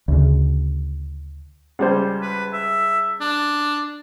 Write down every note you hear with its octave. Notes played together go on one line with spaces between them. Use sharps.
D2 C#3
C#2 G3 C5
B4
E5
D4